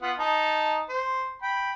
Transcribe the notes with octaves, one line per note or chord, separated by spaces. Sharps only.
B3 F4 F#5
D#4 A5
C5
G5 B5